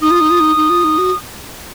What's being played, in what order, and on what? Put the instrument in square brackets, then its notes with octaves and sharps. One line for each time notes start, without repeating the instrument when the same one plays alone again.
[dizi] D#4 [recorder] D#6
[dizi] F4
D#4
F4
D#4
D#4
F4
D#4
F#4